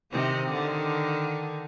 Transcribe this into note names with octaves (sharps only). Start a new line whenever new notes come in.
C3 D#3 C4
D3 D#3